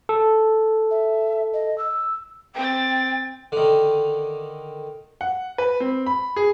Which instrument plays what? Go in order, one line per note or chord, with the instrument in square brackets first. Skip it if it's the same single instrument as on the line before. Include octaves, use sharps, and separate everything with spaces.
[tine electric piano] A4
[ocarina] E5
D#5
E6
[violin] C4 A6 [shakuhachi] G5
[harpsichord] D3 D#3
[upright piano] F#5
B4
C4
B5
G#4